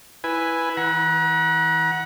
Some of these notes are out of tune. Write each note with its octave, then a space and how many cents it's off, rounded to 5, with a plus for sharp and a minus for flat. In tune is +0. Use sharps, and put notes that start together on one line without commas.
E4 +0 B4 +0 G#5 +0
E3 -45 F#5 +0 A#5 +45